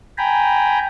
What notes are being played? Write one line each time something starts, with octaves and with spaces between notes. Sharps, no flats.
G5 G#5 A#5 B5